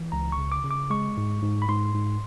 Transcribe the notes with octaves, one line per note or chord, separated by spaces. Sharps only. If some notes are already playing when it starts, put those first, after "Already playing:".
Already playing: E3
C#2 A#5
C#6
C#3
D6
C#3
D6
G#3 C#6
G#2
G#2
B5
G#2 C6
G#2